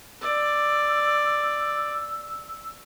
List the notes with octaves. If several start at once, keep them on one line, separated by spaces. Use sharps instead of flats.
D5 E6